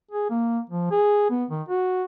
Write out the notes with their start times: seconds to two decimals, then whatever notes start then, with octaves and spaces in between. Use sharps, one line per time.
0.11 G#4
0.30 A#3
0.70 F3
0.91 G#4
1.30 B3
1.51 D#3
1.69 F#4